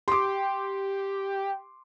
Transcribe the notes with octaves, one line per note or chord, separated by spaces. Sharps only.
G4 C6 D6